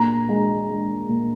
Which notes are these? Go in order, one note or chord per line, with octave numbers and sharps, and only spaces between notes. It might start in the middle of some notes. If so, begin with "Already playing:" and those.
Already playing: A#2 A#5
G#3
G#3
A#2